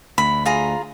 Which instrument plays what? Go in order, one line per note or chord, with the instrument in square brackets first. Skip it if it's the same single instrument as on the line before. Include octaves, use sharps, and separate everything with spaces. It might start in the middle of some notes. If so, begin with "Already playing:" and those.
[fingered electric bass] D2 [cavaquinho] B5
[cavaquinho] F4 G#4 A#5